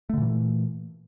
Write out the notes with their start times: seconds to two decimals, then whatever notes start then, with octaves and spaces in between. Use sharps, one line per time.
0.09 A3
0.14 D3
0.18 A#2
0.22 E3